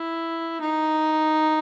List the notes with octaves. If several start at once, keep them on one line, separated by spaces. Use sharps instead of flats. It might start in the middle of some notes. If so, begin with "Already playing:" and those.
Already playing: E4
D#4